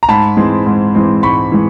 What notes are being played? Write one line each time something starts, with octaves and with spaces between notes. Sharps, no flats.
A#5
G#2 A5 B5
E3 G#3 C4
G#2
E3 G#3 C4
G#2 B5 C#6
E3 G#3